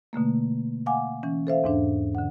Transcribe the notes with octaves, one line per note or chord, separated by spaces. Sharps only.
B2 D3 A3 A#3
F5 F#5 G#5 D6
E3 C#4
A4 C5 E5 F5
E2 G#2 D4
D3 F#5